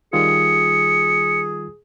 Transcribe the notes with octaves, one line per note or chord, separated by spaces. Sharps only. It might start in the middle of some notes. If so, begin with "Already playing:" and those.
D#3 G3 F4 G#4 C#7